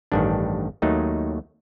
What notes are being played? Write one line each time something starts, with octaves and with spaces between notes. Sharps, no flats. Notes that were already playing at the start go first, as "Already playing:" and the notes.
A1 G2 D#3 D4
D#2 D#3 F#3 A3 D#4